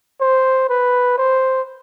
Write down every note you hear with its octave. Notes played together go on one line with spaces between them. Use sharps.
C5
B4
C5